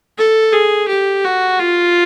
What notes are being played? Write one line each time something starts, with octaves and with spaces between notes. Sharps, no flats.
A4
G#4
G4
F#4
F4